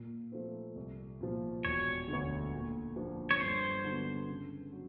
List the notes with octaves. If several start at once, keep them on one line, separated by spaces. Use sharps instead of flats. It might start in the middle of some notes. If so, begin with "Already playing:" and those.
Already playing: A#2
F3 A3 C4
C2
A#2 F3
E1 C#5
D3
D2
A#2
F3 A#3 D4
C#5
G2 C5
D3 F#3 B3 D4
C#3
F#3